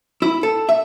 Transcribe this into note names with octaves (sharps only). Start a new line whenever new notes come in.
E4
A4
E5